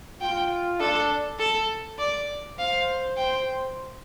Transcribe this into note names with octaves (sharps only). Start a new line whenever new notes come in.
F4 G5
D4 A4
A4
D5
C5 F5
G5